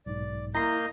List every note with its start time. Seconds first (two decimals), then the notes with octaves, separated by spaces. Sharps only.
0.06 B1 G#2 D5
0.55 A#3 E4 D#5 A#5 C6 G6